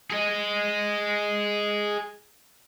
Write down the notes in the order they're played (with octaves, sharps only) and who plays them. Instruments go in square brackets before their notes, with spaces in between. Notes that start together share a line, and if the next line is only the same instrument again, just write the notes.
[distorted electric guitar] G#4 D#5